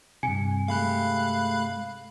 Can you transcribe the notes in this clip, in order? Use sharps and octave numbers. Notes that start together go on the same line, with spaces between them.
G2 C3 G#5 C#7
G#3 A3 G4 F5 B5 F#6